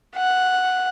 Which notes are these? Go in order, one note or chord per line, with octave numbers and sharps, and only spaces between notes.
F#5